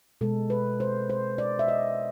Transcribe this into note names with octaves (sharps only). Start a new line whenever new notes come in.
B2 G#3 A4
B4
C5
C5
D5
E5
D#5